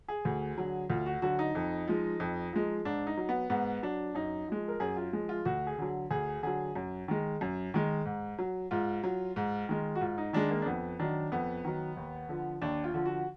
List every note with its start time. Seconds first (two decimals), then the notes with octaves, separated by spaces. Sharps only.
0.08 G#4
0.25 D2
0.58 D3 F#3
0.89 D2 F4
1.06 F#4
1.22 D3 F#3 F#4
1.39 D#4
1.55 F2
1.87 F3 G#3
2.20 F2
2.53 F3 G#3
2.85 G#2 D4
3.07 D#4
3.17 F#3
3.29 B3
3.50 G#2 B3
3.83 F#3 D4
4.15 F#2 D#4
4.48 F3 G#3
4.68 A#4
4.80 F#2 G#4
4.97 F4
5.13 F3 G#3
5.29 F4
5.45 D2 F#4
5.67 G#4
5.78 D3 F#3
6.11 D2 G#4
6.43 D3 F#3 G#4
6.75 F#2
7.08 D#3 G#3
7.41 F#2
7.74 D#3 G#3
8.06 G#2
8.39 F#3
8.71 G#2 F4
9.04 F#3
9.36 G#2
9.69 D#3 G#3
9.95 F#4
10.01 G#2 F4
10.18 D#4
10.33 D#3 G#3 D4
10.50 A#3
10.62 D4
10.66 F2 B3
10.99 D#3 F#3 D4
11.32 F2 B3
11.65 D#3 F#3
11.97 D#2
12.29 D3 F3
12.62 D#2 D4
12.84 F4
12.94 D3 F3
13.06 F#4